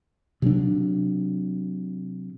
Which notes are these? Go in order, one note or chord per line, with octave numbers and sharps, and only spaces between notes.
C3 F#3 C4 D4